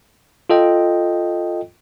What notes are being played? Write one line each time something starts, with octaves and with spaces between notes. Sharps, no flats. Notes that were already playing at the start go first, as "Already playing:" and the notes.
F4 A4 D#5 G5